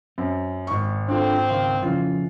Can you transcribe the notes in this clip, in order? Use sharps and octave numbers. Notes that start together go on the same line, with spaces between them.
F#2 C4
G#1 C#6
C4 D4 F4 A4
C#2 D#3 F5
F2 C#3 E3 F4